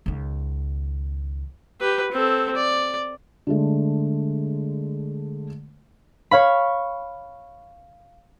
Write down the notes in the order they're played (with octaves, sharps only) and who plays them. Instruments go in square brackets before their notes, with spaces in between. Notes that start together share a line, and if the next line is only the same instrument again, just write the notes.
[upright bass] C#2 D#3
[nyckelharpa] G4 B4
C4 A4
D5
[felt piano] D3 G#3 A3
[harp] C#5 F5 B5